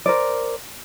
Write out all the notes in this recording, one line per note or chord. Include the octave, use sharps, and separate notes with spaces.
A#4 C5 D5